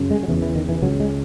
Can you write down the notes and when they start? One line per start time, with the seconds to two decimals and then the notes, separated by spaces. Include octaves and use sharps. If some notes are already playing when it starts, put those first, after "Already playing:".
Already playing: F#2 C#3
0.11 G#3
0.23 F#3
0.28 E2 C#3 E3
0.42 E3
0.55 D#3
0.69 E3
0.82 C#2 C#3 F#3
1.00 G#3